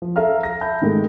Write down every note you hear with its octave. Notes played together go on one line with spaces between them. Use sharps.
F3
A4 E5 F5 A#5 F6
A#6
E5 A5 B5 G6
G#2 D#3 G#3 A3